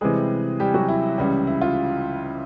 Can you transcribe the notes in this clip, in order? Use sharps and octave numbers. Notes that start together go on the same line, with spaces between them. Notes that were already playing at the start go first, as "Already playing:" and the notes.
C3 E3 G3 G#3 G#4
G3 G4
F#3 F#4
E4
C#2 C#3 E3 G3
E4
F4